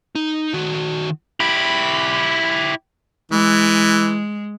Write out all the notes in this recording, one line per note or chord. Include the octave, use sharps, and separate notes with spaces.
D#4
D#3 F#4
E4 G4 B5
E3 G#3